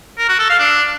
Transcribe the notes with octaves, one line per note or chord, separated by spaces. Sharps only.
A#4
F#4
A4
F5
D4